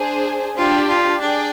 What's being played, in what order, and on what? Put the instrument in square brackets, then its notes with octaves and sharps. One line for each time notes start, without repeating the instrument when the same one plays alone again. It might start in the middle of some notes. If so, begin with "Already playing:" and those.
Already playing: [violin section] D4 G#4 C5
[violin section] D4 G4 D5 [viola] F4
[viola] F4
[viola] D4 [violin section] G#4 D5 G5